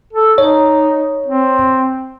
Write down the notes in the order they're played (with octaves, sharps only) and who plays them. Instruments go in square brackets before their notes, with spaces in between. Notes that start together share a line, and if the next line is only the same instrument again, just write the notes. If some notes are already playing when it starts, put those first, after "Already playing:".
[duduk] A4
[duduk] D#4 [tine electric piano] C#5
[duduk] C4